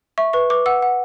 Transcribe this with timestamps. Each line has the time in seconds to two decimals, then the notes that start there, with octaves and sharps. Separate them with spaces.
0.18 E5 C#6
0.33 B4 C#6
0.50 B4 D6
0.66 F#5 E6
0.82 F#5